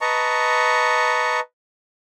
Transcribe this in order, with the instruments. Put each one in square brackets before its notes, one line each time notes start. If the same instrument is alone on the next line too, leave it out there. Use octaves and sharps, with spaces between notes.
[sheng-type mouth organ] B4 D#5 A5 A#5 C#6